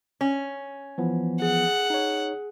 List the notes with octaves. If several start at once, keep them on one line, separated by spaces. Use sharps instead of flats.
C#4
E3 F3 B3
G#4 F#5
D#4 C#5